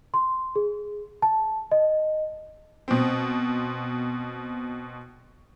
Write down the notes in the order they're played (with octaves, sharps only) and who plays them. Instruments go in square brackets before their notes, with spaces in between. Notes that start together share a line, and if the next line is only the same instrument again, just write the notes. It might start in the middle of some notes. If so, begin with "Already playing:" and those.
[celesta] C6
G#4
A5
D#5
[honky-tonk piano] B2 C4